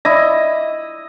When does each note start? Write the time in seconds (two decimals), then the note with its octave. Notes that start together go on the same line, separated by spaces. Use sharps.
0.05 E4 D#5